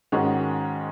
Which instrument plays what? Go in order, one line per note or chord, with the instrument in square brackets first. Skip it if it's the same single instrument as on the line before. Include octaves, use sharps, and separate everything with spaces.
[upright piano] G#2 D#3 G#3 C#4 F#4